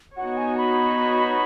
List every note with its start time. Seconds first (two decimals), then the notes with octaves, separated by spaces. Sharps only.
0.17 B3 D#4 F#4 C#5 F#5
0.37 G#5
0.57 B5